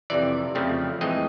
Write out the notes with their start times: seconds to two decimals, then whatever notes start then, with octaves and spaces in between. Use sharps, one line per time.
0.10 F2 C3 E3 D5
0.55 F2 C#3 F3 A3 C4
1.01 A2 E3 G#3 C4 D#5